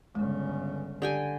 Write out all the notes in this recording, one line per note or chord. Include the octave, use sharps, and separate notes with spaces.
G1 C#3 G#3
D3 G4 G5 G#5